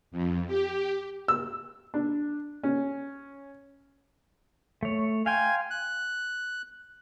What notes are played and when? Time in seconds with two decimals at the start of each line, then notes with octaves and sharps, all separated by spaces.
0.11 F2
0.47 G4
1.28 E6
1.94 D4
2.63 C#4
4.83 A3 C#5
5.26 F5 G5 G#5 C6
5.70 F#6